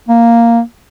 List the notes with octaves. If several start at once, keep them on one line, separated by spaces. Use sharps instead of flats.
A#3